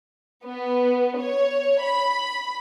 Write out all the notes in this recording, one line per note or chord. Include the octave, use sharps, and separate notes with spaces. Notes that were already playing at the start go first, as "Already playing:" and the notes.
B3
C#5
B5